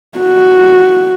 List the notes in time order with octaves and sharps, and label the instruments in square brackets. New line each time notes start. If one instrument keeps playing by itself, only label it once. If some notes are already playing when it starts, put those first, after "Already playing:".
[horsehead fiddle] F#4